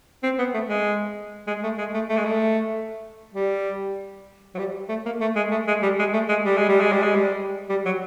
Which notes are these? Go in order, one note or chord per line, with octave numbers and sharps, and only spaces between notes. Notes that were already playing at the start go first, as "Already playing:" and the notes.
C4
B3
A3
G#3
G#3
A3
G#3
A3
A3
G#3
A3
G3
F#3
G3
A3
A#3
A3
G#3
A3
G#3
G3
G#3
A3
G#3
G3
G#3
G3
G#3
G3
G#3
G3
G3
F#3